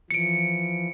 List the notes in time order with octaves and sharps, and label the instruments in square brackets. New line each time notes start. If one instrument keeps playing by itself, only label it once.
[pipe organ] E3 F3 [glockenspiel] C#7 D7